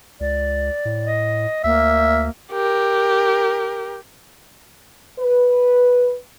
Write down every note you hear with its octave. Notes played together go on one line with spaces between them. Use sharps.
C#2 D5
A2
D#5
D2 A#3 E5
G4 A#4
B4